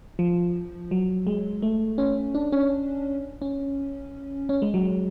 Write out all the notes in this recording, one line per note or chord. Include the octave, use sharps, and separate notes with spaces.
F3
F#3
G#3
A3
C#4
D4
C#4
C#4
C#4
G#3
F#3